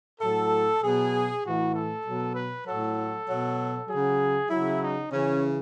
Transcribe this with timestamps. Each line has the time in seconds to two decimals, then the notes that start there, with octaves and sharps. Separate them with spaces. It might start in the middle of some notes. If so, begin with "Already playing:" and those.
0.21 A2 F#3 A4
0.81 B2 F#3 G#4
1.43 A2 E3 F#4
1.74 A4
2.05 B2 F#3
2.35 B4
2.66 A2 F#3 A4
3.28 B2 F#3
3.88 C#3 F#3 G#4
4.50 C#3 F#3 E4
4.81 D#4
5.11 C#3 E3 C#4